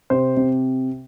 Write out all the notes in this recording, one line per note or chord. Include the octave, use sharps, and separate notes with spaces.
C3 C5
C3